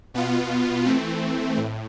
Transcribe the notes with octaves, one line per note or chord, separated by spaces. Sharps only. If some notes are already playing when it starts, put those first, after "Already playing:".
B2 B3 F4
E3 A3 C4
A2